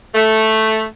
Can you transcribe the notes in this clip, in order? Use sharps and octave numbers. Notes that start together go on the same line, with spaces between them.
A3